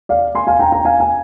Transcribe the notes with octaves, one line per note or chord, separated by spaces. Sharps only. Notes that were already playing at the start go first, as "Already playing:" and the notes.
D5 F5
G#5 C6
F5 G#5
G5 A#5
G5 A#5
F5 G#5
G#5